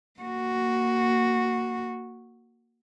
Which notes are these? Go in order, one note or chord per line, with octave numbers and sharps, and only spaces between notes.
A#3 F#4